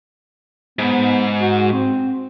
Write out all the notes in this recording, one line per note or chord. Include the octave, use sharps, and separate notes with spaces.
G#2 B3
F#4
C4